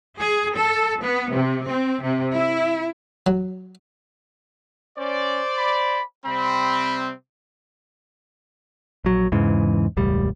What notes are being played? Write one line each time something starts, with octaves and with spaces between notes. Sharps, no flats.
G#4
A4
B3
C3
C4
C3
E4
F#3
C#4 C5 D5
B5
C3 G3 C4 B5
A#1 F#3
E2 G#2 C#3 E3
E1 C#2 A2 G3